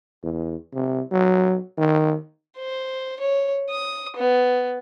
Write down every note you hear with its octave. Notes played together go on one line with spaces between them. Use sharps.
E2
C3
F#3
D#3
C5
C#5
D#6
B3